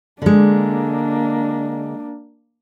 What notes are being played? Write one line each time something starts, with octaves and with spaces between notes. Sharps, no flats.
D3 G#3 A#3 D4